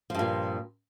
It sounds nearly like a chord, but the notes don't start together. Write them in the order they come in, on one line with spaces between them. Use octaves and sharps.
F3 G2 A#2